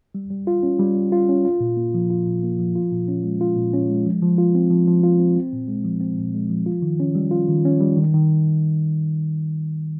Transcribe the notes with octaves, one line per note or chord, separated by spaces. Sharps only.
G3
G3
F4
C#4
G3
G3
F4
C#4
F4
A#2
A#3
F3
F4
A#2
A#3
F3
F4
A#2
C#4
G#3
F4
A#2
C#4
G#3
F3
F3
F4
C4
F3
F3
F4
C4
C4
A#2
G#3
F3
C4
A#2
G#3
F3
F4
D#3
C#4
G3
F4
D#3
C#4
G3
D#3
D#3